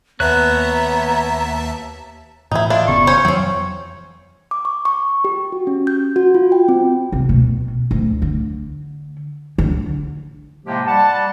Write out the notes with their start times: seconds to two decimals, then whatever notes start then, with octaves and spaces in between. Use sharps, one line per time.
0.20 D#2 B3 C#5 E5 A5 A#5 F#6
2.51 A2 E3 D#4 E4
2.70 D4 E4 F4
2.87 F#1 C#3 B3 C#6
3.07 C#4 C5 C#5
3.25 F2 E3 F#3 C4 C#4
4.51 D6
4.65 C#6
4.85 C#6
5.24 G4
5.52 F#4
5.67 C#4
5.87 G6
6.16 F#4
6.34 F4
6.52 G5
6.68 C4
7.12 C2
7.29 B2
7.91 D2
8.22 D3
9.58 D3
10.66 A2 C3 F3 G#3 A#3 G4
10.86 G3 F#5 A5